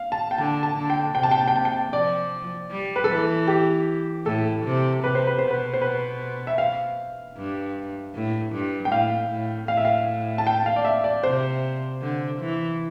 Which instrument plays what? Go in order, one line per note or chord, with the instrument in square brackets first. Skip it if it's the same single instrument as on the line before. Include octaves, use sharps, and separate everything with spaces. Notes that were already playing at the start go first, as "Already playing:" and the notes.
Already playing: [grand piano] F5
A5
G5
[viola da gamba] D3 [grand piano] A5
[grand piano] A5
[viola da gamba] D3
[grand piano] G5
[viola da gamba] C3 [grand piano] G5
[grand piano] A5
G5
A5
G5
[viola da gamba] C3 [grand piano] A5
[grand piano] G5
[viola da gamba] F3 [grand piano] D5
[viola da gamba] G3
[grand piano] B4
A4
[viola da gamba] E3 [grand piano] B4
[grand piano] G4
[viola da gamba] A2 [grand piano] A4
[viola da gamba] C3
[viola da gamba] C3 [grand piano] B4
[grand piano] C5
B4
[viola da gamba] B2 [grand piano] C5
[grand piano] B4
C5
B4
E5
F5
[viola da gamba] G2
A2
G2
[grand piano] G5
[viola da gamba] A2 [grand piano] F5
[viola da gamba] A2
[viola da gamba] A2 [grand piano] F5
[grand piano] E5
F5
A5
G5
F5
D5
E5
D5
[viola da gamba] C3 [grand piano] C5
[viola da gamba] D3
E3